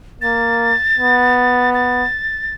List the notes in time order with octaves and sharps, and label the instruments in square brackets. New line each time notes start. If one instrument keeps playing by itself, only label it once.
[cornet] A#3 [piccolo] A6
[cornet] B3
[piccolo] A6